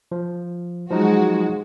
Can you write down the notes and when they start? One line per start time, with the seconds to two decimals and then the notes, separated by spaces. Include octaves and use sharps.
0.12 F3
0.90 F3 F#3 G#3 D#4 F#4